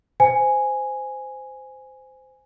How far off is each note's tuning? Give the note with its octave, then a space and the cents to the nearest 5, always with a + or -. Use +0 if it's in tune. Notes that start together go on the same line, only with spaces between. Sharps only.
C5 -15 G#5 +0